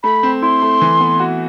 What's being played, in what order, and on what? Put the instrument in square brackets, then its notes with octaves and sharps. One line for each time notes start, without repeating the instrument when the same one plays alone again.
[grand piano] A3 [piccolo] B5
[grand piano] C4
[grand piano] E4 [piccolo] C6
[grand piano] A3
E3
B3
F#4